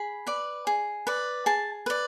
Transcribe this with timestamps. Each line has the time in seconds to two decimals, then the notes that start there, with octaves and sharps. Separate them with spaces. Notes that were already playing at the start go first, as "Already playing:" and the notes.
Already playing: G#4 B5
0.27 B4 D5
0.67 G#4
1.07 B4 D5
1.46 G#4 A5
1.86 B4 D5